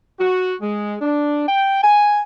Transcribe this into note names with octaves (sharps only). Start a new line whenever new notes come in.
F#4
G#3
D4
G5
G#5